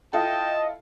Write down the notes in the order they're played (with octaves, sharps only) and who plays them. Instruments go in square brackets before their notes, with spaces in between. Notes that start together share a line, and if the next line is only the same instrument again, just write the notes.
[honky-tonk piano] E4 F4 A4 [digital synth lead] D#5 [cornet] G5 [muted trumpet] A5